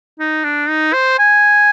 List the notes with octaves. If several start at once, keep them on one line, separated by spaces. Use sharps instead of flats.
D#4
D4
D#4
C5
G#5